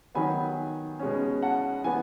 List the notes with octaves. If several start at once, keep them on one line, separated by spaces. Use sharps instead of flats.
D#3 F#3 B3 G#5 B5
B2 G#3 C#4
F#5 A5
E3 B3 G#5